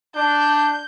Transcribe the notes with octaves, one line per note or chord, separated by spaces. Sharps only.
D4 G6